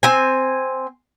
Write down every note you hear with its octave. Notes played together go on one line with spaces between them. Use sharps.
C4 G#5